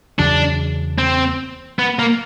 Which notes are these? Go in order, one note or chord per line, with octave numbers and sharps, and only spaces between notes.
E2 C#3 F#3 D4
C4
B3
A#3